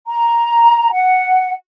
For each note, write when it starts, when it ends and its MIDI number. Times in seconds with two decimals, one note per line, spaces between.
0.07 0.92 82
0.92 1.51 78